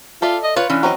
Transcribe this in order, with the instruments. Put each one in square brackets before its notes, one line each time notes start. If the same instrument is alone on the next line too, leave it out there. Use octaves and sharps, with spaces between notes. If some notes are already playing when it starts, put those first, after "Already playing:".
[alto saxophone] F4 [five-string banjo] A4 D5 E5
[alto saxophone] D#5
[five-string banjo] F4 [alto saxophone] B4 [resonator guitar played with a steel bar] C#5
[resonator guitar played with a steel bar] E3 C#4 [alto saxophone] D4
[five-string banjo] F#3 C4 D#5